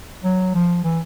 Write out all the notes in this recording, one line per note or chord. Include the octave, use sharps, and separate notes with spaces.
F#3
F3
E3